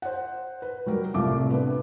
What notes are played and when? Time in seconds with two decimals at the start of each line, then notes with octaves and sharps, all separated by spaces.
0.02 C5 F#5
0.62 B4
0.86 F#3 G3 A#4
1.14 C2 A2 C3 F4 D6
1.50 B3 D4 B4